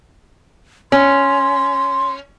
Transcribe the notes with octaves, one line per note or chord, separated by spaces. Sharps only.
C#4 C6